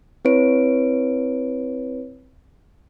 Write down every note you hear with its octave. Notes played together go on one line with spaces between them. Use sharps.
C4 E4 B4 C#5 D7